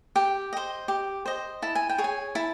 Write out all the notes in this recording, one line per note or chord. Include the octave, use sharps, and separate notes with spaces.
G4 G5
C5 D#5
G4
C5 D#5
E4 A5
G#5
G5
G#4 C#5
G#5
E4 A5